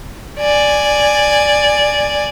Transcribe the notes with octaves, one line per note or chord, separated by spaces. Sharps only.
D5 G#5